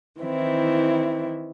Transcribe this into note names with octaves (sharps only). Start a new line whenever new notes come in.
D#3 E3 C4 E4